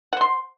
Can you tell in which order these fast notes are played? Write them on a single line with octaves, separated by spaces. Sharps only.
F#5 C5 C6